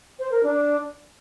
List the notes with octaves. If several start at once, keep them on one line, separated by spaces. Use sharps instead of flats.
C5
A#4
D4